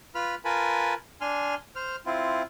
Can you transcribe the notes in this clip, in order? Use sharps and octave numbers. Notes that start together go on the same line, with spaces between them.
F4 B4 B5 F6
F4 A#4 B4 G#5 A5 B5
D4 G#5 C6 F6
C5 F6
C4 E4 F4